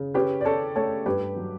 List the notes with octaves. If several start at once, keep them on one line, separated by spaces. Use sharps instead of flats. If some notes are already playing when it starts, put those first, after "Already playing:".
Already playing: C#3
C#4 G4 B4
D5
C#4 A4 C#5
A3 A4 C#5
G2 G4 B4
F#3